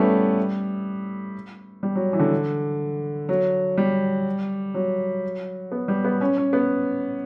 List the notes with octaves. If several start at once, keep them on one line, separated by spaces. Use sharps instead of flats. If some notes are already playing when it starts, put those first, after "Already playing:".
Already playing: G3 A3 B3 C#4 E4
G3
F#3
E3
D3
F#3
G3
F#3
B3
G3
B3
C#4
C#4
B3